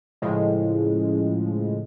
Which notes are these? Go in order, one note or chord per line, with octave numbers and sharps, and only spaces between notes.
A2 C#3 F3 G#3